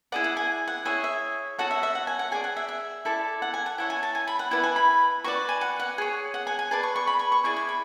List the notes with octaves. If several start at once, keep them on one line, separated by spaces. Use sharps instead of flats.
E4 G#4 D5 F#5
F#5
G#5
F#5
E4 G#4 C#5 E5
E5
F#4 A4 C#5 F#5
E5
E5
F#5
G#5
F#5
G#4 D5 G#5
F#5
E5
E5
E4 A4 D5
F#5
G#5
F#5
E4 A4 C#5 F#5
G#5
A5
G#5
B5
F#5
E4 B4 D5 F#5
G#5
B5
F#4 B4 D5 C#6
G#5
F#5
F#5
G#4 C#5
F#5
G#5
G#5
G#4 B4 D5 A5
C#6
C#6
B5
C#6
C#6
E4 G#4 D5 C#6
C#6
B5